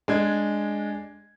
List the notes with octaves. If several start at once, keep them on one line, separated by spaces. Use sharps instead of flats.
G#3 D4 G#6